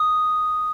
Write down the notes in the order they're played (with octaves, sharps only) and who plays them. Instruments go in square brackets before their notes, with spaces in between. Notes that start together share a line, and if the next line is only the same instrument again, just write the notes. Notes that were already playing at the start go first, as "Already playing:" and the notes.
Already playing: [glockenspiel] D#6